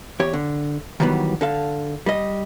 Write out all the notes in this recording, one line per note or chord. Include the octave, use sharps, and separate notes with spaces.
E2 G4 C#5
D3
D#3 E3 F#3 G3 B3
D3 A4 F5
G3 D#5